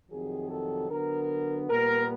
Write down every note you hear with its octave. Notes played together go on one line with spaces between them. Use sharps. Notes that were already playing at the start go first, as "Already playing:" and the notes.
F2 C3 D#3 F#3 G#4
A4
D3 F#3 B3 A#4
A#2 G3 B3 A#4